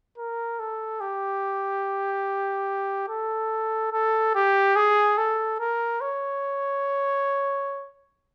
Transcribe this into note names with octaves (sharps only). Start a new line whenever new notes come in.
A#4
A4
G4
A4
A4
G4
G#4
A4
A#4
C#5